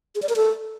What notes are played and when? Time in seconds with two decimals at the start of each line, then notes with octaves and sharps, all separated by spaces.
0.15 G#4
0.22 D5
0.29 A#4
0.36 A4